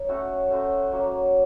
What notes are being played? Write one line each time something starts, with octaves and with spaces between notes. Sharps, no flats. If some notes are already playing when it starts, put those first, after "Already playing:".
Already playing: D#4 C#5
A3 C#4 F#4 A4
A3 C#4 F#4 C5
F#3 A#3 C#4 F#4